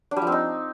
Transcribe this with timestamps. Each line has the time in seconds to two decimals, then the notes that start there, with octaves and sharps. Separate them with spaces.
0.11 D4
0.17 G3
0.22 F3
0.27 C4
0.32 D#4